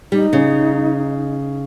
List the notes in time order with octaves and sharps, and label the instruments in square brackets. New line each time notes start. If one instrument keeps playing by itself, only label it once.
[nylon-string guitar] G3 [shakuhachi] D#4
[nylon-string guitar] C#3